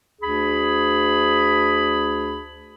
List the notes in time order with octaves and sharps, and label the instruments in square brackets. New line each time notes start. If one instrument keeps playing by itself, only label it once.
[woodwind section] D2 D4 G#4 B5